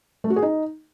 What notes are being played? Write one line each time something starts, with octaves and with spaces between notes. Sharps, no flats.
A3
F#4
G#4
D#4